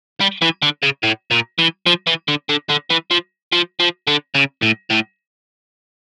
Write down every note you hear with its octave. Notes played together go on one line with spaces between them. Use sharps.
G3
E3
D3
C#3
A2
A#2
E3
F3
E3
D3
D3
D3
E3
F3
F3
F3
D3
C#3
A2
A2